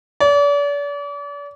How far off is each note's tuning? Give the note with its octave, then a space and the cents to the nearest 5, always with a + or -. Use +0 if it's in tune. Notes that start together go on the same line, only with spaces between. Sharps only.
D5 -40